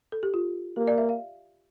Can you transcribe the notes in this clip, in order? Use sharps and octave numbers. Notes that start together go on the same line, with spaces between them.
A4
G4
F4
A#3 G4
D5
E5
F5